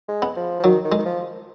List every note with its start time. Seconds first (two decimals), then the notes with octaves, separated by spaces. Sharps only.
0.08 G#3
0.22 B3
0.36 F3
0.60 F3
0.64 D#3 F#3
0.85 D#3
0.92 G#3
0.99 D#3
1.05 F3